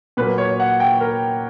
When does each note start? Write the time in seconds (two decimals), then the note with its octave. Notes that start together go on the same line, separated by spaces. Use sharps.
0.17 A#2 F#3 A#3 B4
0.38 C#5
0.60 F#5
0.80 G5
1.01 A#4